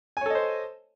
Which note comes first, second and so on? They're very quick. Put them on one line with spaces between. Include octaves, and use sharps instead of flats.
G#5 C#5 A4 D#5 C5